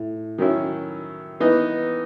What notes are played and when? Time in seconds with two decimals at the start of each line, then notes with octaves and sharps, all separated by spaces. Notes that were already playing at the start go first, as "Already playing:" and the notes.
Already playing: A2
0.38 D#3 F#3 C#4 E4
1.40 E3 B3 D#4